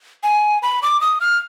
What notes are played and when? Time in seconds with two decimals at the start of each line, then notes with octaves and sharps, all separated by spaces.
0.23 G#5
0.63 B5
0.83 D6
1.01 D#6
1.21 F6